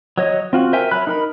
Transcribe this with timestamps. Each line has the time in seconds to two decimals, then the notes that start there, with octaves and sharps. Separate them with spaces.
0.18 F#3 C#5 D#5
0.53 C4 F4 F#4
0.73 A#4 C5 E5 G5 G#5
0.91 F#3 B5 F#6
1.07 D#4 A#4 B5